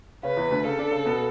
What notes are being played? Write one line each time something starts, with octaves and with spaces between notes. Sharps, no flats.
C#3 C#4 B4
E2 E3
D2 D3
C#3 C#4 A4
D3 D4
C#3 C#4
B2 B3